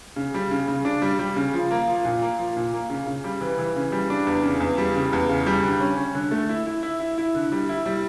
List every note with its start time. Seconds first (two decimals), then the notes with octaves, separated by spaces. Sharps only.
0.16 C#3
0.34 G3
0.51 C#3
0.68 C#3
0.85 D4
1.02 G3
1.19 G3
1.36 C#3
1.54 F3
1.71 A#3
1.88 F3
2.05 A#2
2.22 A#3
2.39 F3
2.57 A#2
2.73 A#3
2.90 C#3
3.07 C#3
3.24 G3
3.41 E3
3.59 E3
3.76 C#3
3.92 G3
4.10 D4
4.27 E2
4.44 C#3
4.60 E2
4.78 G3
4.95 C#3
5.13 E2
5.29 C#3
5.46 G3
5.63 D3
5.80 C#4
5.97 C#4
6.15 D3
6.31 A3
6.49 E4
6.67 E4
6.83 E4
7.00 E4
7.18 E4
7.35 D3
7.52 G3
7.69 E4
7.86 G3